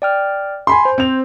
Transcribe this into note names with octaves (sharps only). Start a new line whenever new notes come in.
D5 G5 F6
G#5 B5 C6
C5
C4 F7